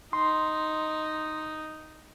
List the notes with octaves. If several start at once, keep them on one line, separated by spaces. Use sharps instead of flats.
D#4 C6